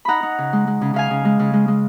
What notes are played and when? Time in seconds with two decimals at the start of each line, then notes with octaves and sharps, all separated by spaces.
0.05 D#4 F#5 A#5 B5
0.23 D#4
0.38 C#3
0.53 G#3
0.67 G#3
0.81 C#3
0.94 C#3 F5 G#5
1.10 C#3
1.25 G#3
1.39 C#3
1.53 G#3
1.68 G#3